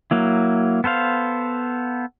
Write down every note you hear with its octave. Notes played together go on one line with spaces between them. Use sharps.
F#3 A#3 E4
B3 A4 C5 F5